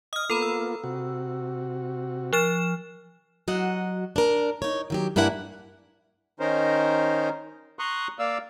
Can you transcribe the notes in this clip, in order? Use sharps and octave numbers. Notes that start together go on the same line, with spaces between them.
D#5 D#6 F6
A#3 B3 F4 A4 A#5 B5
E6
C3 F#4
F3 F6 E7
F#3 F#4 D#5 F#5
D4 A#4
D#4 C#5
D#3 F#3 G4
G2 A#3 D4 E4 F#5 G#5
D#3 C#4 D#4 A#4 C5
A#5 C6 C#6 D#6 F#6
A#3 D5 F5 E6